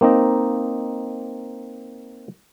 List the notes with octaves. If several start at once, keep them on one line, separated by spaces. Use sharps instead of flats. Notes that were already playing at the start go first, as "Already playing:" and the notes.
A#3 C4 D#4 D#5